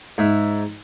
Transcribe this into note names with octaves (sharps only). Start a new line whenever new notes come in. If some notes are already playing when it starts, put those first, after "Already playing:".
G#2 E5